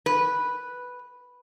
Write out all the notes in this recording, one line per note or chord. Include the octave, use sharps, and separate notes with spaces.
B4